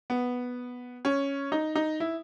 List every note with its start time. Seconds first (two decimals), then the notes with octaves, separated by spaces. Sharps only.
0.10 B3
1.05 C#4
1.52 D#4
1.75 D#4
2.00 E4